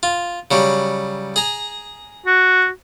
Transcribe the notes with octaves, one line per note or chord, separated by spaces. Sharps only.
F4
C#3 F#3 G3
G#4 A#5
F#4